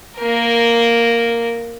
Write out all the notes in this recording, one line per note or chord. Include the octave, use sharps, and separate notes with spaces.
A#3 A#4